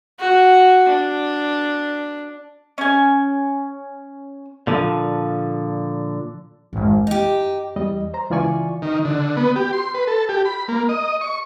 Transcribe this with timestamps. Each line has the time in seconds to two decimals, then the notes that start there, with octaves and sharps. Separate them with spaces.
0.20 F#4
0.89 D4
2.78 C#4 G#5
4.67 A#2 D3 F3
6.73 G#1 F#2
6.95 F#2
7.07 D#4 G4
7.76 E2 G3 D#5
8.14 C5 A#5
8.30 C#2 E3 F4 D5 G#5 C#6
8.82 D#3
9.05 D3
9.37 B3
9.56 G4
9.73 C6
9.94 B4
10.07 A4
10.29 G4
10.45 B5
10.68 A#3
10.89 D#5
11.21 C#6